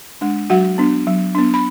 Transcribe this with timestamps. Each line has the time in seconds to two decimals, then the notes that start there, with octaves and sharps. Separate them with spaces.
0.21 G#3 D4
0.50 F#3 F#4 F#5
0.78 B3 D4
1.07 F#3
1.35 B3 D4
1.54 B5